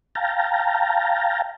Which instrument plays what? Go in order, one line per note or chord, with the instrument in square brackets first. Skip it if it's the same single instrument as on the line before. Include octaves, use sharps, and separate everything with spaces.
[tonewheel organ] F5 G5 A5 A#5